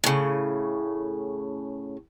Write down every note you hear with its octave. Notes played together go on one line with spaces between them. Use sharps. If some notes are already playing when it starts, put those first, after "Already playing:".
A2 C#3